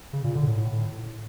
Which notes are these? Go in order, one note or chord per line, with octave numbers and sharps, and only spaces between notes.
C#3
A#2
D3
A2
A2